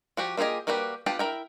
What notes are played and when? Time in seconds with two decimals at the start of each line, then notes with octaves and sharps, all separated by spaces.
0.17 F3 F#4 G4
0.37 A#3 F4 G4 G#4 D#5
0.67 G3 A#3 F#4 G4 B4
1.06 B3 F4 G4 G5 A5
1.19 E4 A#4 G5